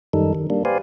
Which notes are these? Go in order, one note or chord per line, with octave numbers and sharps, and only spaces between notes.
F#2 D#3 G3 D#4 A4
D#3
G3 A#3 D4
G4 B4 C5 D5 F5 G#5